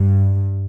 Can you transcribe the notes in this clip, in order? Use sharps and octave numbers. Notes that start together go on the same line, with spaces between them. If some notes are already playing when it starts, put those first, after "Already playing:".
Already playing: G2